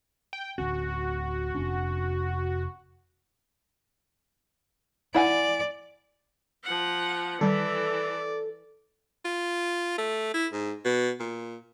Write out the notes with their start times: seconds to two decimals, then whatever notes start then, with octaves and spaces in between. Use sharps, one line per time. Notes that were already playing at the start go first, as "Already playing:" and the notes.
0.33 G5
0.58 D1 D2 C#4 F#4
1.55 F1 C#4 D4
5.14 E4 D5 F#5 G#5
6.64 F3 F#5
7.41 D#3 E3 G3 A4 D5
9.25 F4
9.98 A3
10.34 E4
10.52 G#2
10.85 B2
11.20 A#2